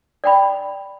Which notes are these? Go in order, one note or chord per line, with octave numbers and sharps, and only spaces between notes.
D5 G5 B5